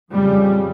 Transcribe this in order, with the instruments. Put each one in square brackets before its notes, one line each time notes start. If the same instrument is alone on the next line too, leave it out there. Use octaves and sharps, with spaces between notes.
[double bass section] F2 C#3 G3